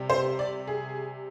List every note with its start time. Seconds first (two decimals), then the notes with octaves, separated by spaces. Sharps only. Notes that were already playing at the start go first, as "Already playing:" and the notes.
Already playing: C3 G3
0.10 C5
0.39 D5
0.67 G#4